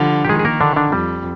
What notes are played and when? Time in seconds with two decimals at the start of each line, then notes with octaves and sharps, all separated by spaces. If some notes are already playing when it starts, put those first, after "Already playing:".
Already playing: D3 F3 G3
0.25 G4
0.29 D#3 G#3 G#4
0.39 G#4
0.45 A#3 A#4
0.60 D3 D4
0.76 D3 D4
0.92 F2 G3